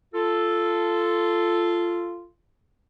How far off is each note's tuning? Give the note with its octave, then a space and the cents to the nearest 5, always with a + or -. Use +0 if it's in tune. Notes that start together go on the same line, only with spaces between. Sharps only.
F4 -10 A4 +0